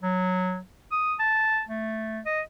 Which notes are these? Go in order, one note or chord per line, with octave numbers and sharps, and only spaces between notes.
F#3
D#6
A5
A3
D#5